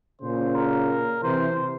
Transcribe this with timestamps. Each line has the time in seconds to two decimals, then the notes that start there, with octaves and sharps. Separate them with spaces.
0.21 A#2 C#3 C5
0.55 A#4
1.22 C3 E3 C5